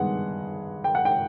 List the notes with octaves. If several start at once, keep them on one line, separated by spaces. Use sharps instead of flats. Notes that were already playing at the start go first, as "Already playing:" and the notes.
Already playing: G2 D#3 G#3 B3 F#5
G5
F#5
G5